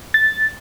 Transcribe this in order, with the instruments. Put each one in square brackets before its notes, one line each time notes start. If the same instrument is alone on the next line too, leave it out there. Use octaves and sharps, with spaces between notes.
[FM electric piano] A6